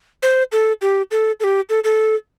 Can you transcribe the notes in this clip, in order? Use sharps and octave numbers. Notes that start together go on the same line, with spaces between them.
C5
A4
G4
A4
A4
G4
A4
A4